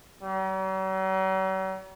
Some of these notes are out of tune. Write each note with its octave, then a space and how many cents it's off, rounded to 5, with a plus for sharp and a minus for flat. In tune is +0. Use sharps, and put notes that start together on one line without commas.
F#3 +45